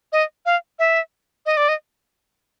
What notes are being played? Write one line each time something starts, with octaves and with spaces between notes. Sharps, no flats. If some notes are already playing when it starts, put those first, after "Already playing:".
D#5
F5
E5
D#5
D5
D#5